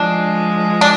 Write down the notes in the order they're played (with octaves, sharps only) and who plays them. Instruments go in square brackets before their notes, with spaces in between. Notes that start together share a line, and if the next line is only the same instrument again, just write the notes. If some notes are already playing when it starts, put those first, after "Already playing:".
Already playing: [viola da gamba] F3 G#3 [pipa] D4
[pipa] D4